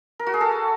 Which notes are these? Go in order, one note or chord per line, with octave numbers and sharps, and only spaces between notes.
A#4
F#4
G#4
A4